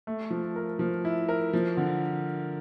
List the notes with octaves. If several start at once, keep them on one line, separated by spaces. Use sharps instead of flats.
A3
F3
A#4
F3
E4
A#4
F3
D3